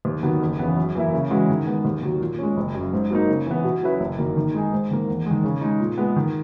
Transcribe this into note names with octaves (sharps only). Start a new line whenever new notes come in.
D#2
D#3 F#3 B3
F#1
E2 C#3 E3 B3
F#2
E3 A#3 E4
C#3
E3 G#3 C#4 F#4
D#3
G#3 B3
D#2
D#3 F#3
A#2
G#3 C#4
F#1
F#2 C#3
G#2
F#3 A#3 D#4
C#3
E3 B3
B2
F#3 C#4 E4 B4
F#1
F#2 D#3 A#3
D#3
G#3 D#4 G#4
G#2
D#3 A#3
E2
D#3 G#3
C#3
G#3 D#4
A#2
G#3 B3
D#3